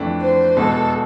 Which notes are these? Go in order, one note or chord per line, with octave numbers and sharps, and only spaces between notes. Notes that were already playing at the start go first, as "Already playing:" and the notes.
Already playing: F2 E3 A3 D4
C5
E2 B2 G#3 A4